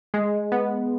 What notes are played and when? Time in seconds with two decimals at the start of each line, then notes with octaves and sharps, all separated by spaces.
0.14 G#3
0.52 B3